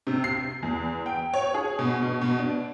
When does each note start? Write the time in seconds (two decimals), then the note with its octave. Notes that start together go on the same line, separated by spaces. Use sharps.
0.07 C3
0.24 C7
0.63 E2
1.06 G5
1.33 C#5
1.54 G#4
1.79 B2
2.02 B2
2.22 B2
2.38 D4